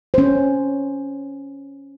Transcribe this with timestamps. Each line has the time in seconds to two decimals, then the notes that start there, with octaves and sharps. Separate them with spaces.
0.14 C#4 C5